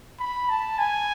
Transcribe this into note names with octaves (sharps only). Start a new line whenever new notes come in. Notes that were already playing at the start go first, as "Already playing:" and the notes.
B5
A5
G#5